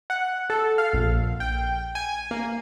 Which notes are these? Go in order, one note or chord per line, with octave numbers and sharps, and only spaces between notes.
F#5
A4
F5
A#1
G5
G#5
A#3